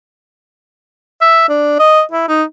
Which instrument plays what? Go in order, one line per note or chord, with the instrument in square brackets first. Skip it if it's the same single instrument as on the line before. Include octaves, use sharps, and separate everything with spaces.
[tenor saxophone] E5
D4
D#5
E4
D#4